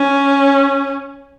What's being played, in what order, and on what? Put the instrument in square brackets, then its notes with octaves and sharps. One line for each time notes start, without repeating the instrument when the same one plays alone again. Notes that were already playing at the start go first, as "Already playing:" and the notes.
Already playing: [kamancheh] C#4